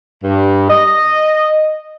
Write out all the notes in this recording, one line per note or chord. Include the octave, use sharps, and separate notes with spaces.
G2
D#5